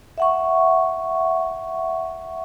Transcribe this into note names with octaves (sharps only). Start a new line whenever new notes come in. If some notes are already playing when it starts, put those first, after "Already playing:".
E5 F#5 C#6